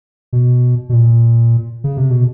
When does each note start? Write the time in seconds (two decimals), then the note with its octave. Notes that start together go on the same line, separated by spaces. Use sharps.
0.33 B2
0.89 B2
0.93 A#2
1.84 C#3
1.97 C3
2.11 B2